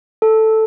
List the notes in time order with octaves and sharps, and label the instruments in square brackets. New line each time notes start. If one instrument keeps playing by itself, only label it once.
[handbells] A4